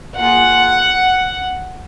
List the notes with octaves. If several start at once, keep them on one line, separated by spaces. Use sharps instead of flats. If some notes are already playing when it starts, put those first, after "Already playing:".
A#3 F4 G#4 F#5